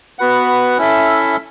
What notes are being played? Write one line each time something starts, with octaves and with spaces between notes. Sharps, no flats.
B3 F#4 B4 F#5
C#4 E4 A4 E5